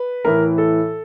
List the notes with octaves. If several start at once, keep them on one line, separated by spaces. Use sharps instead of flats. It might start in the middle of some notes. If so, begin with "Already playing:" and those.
Already playing: B4
A2 E3 A#4
A4